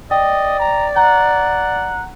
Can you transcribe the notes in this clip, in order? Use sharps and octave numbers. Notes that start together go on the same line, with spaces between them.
D5 D#5 G5
A#5
F#5 A#5